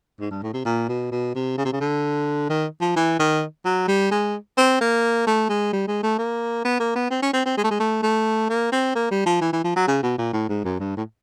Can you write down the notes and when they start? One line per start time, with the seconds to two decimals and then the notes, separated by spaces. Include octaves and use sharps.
0.20 G#2
0.31 G2
0.43 A2
0.53 C3
0.65 A#2
0.89 B2
1.11 B2
1.35 C3
1.57 C#3
1.65 C3
1.73 C#3
1.80 D3
2.50 D#3
2.80 F3
2.96 E3
3.19 D#3
3.65 F#3
3.88 G3
4.11 G#3
4.58 C4
4.81 A#3
5.27 A3
5.49 G#3
5.73 G3
5.87 G#3
6.03 A3
6.18 A#3
6.65 B3
6.80 A#3
6.95 B3
7.10 C4
7.22 C#4
7.33 C4
7.45 C4
7.57 G#3
7.64 A3
7.71 G#3
7.80 A3
8.03 A3
8.50 A#3
8.72 C4
8.95 A#3
9.11 G3
9.26 F3
9.41 E3
9.53 E3
9.64 F3
9.76 F#3
9.88 C#3
10.03 B2
10.18 A#2
10.33 A2
10.49 G#2
10.64 F#2
10.80 G2
10.97 A2